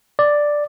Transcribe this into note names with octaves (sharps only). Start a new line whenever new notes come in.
D5